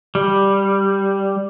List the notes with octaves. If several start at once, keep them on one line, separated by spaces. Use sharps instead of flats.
G3